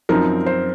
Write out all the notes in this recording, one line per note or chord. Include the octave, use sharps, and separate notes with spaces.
F#2 F3 C4 D#4 A#4
C5